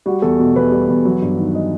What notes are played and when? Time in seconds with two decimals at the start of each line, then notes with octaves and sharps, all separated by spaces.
0.06 G3 F#4
0.22 E2 A4
0.39 B2
0.55 E2 B4
0.72 G3
0.88 E2
1.05 F#3
1.21 G2
1.38 D#3
1.55 D#5